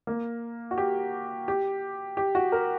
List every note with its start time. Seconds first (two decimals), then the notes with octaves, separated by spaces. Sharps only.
0.07 A#3
0.71 F#4
0.78 G4
1.48 G4
2.17 G4
2.35 F#4
2.52 A#4